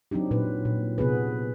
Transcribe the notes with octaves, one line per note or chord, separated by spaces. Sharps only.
F#3 C4 D4 D#4 G4
A#2 F#3 D#4 B4
A#2
C3 B3 G#4 B4